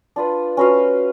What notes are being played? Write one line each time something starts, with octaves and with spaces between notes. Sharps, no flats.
D4 F4 B4
C#4 F#4 B4 F5